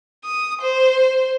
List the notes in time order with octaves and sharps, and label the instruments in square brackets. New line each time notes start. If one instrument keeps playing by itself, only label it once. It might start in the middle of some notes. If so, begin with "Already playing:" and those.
[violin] D#6
C5